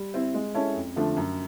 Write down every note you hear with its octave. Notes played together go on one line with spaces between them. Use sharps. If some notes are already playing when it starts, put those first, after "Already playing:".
Already playing: G3
C4 E4
G#3
C#4 E4 A4 C#5
F2
D3 F3 A3 D4
F#2